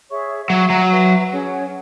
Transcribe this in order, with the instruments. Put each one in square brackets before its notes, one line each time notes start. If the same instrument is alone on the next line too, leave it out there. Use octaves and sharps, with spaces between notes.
[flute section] G#4 C#5 E5 C#6
[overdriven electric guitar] F#3 [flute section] F#4 E5 C#6
[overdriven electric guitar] F#3
[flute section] B4 E5 C#6
C#4 G#4 C#5 F#5